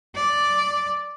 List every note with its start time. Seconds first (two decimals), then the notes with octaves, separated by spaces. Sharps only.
0.15 D5